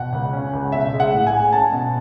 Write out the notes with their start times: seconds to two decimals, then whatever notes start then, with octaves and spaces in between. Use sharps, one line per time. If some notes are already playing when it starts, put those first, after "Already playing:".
Already playing: B2 F#5
0.13 C#2
0.33 C#4
0.53 C#2
0.72 B1 E5
0.93 G#3
1.00 F#5
1.13 A2
1.27 G#5
1.33 G#3
1.53 C#4 A5
1.73 B2